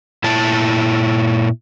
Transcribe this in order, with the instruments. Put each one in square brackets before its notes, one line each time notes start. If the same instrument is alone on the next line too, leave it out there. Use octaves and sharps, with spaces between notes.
[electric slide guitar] A#2 E4 A5